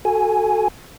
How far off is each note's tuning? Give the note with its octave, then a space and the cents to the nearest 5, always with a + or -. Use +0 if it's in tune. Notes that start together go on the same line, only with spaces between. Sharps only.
F#4 +0 A4 +0 G#5 +0